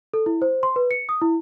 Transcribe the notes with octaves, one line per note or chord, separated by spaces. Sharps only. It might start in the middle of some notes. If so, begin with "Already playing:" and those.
A4
E4
C5
C6
B4
C#7
D#6
E4